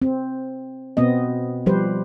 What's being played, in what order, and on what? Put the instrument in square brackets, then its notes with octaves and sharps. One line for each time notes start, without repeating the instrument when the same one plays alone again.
[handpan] C4
B2 B3 C4 D#5
F3 G3 G4 B4 C5